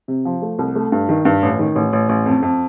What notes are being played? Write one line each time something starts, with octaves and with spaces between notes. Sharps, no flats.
C3
F3
A3
C2
A3
G2
D#3
G2
A1
D#3
A1
A1
A1
F2
F2